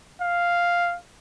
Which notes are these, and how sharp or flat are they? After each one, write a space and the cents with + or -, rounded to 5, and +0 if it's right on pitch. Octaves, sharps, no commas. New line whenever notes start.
F5 +0